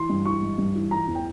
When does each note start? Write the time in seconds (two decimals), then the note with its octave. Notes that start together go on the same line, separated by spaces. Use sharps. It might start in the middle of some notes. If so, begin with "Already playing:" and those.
Already playing: E3 C6
0.10 G2
0.25 E3 C#6
0.42 G#2
0.58 G2
0.75 E3
0.91 E3 A#5
1.07 E2
1.15 G5